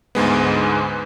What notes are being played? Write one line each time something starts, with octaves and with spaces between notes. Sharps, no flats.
D2 G#2 G#3 B3